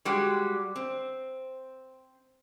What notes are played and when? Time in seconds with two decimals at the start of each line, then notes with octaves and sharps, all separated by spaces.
0.05 G3 G#3 F#4 G4
0.76 C4